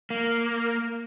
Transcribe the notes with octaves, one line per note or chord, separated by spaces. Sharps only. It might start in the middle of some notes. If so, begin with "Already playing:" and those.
A#3